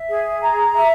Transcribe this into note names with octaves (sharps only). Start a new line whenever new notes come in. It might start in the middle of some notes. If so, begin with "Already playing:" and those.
Already playing: E5
G#4
A#5
E5